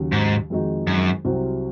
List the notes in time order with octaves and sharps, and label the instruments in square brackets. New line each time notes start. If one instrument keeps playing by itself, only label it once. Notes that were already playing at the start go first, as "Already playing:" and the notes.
Already playing: [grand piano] D#2 C#3 F#3
[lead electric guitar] G#2
[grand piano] F2 D#3 G#3 D#4 F#4
[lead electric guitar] F#2
[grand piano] C2 C3 F#3 C4 F#4